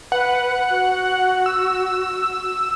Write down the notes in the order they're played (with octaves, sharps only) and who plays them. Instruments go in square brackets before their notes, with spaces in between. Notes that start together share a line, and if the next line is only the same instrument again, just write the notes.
[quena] B4 [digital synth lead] F#5
[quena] F#4
[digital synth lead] E6